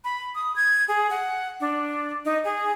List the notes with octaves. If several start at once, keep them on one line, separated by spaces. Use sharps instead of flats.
B5
D#6
G#6
G#4
F#5
D4
D#4
G#4